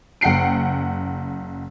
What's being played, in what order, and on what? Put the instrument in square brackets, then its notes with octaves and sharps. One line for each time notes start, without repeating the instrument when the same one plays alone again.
[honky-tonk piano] F#1 F#5 G5 C7 D7